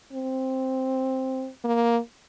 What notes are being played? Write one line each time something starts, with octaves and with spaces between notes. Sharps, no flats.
C4
A#3